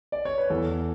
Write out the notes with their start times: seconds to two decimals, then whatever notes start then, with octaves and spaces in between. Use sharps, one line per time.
0.12 D5
0.25 C#5
0.38 B4
0.50 E2 A4